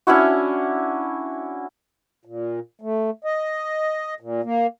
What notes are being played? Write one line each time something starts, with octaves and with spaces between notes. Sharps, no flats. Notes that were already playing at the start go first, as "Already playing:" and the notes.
C#4 D4 E4 F#4
A#2
A3
D#5
A#2
A#3